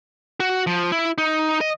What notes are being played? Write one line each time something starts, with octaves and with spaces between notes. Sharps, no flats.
F#4
F3
E4
D#4
D#5